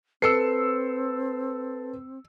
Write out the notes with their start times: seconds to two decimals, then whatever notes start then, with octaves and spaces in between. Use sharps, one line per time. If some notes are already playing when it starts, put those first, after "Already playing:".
0.22 C4 A4 B4 E6 C7 C#7